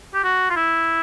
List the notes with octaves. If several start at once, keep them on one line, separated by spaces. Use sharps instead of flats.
G4
F#4
F4
E4